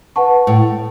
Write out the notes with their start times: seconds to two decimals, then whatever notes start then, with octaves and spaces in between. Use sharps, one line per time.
0.16 B4 F#5 A5 C#6
0.47 A2